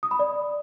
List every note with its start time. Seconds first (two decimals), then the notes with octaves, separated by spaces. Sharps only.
0.03 D#6
0.11 B5
0.19 D5